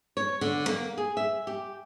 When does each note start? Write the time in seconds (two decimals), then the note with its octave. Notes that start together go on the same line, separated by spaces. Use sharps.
0.17 C#5
0.41 D3
0.68 A#3
0.98 G#4
1.17 E5
1.47 G4